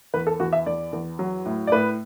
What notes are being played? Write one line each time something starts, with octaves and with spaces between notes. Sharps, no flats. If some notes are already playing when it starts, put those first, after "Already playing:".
E2 B4
A4
E2 F#4
E5
E2 D5
E2
F#3
A2
D5
A2 B4